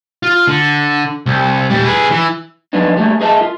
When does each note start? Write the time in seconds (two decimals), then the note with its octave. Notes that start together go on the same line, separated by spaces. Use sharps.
0.23 F4
0.47 D3
1.26 C2
1.70 A#2 G3
1.86 G#4 B4
2.11 E3
2.73 F3 F#3 A#3 B3 D4 D#4
2.97 G3 A3 A#3
3.21 G#4 A#4 D#5 E5 A5
3.41 F4